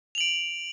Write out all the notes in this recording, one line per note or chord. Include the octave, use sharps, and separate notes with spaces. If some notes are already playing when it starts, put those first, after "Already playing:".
D7 F7 F#7